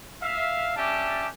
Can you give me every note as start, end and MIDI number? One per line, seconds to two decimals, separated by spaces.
0.22 0.74 76
0.22 0.74 77
0.75 1.27 61
0.75 1.27 62
0.75 1.27 67
0.75 1.27 76
0.75 1.27 81